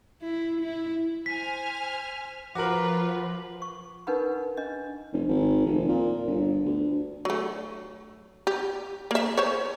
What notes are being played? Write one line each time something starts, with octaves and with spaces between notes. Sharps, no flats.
E4
E4
C5 G#5 F6 B6
F3 F4 F#4 A#4 B4 D6 F#7
C#6
D4 D#4 A#4 B4 F#5 B5
D4 D#5
F1
G#1
F1
A#2
G1
D2
F#3 A3
G4
A#3 E5
C5 C#5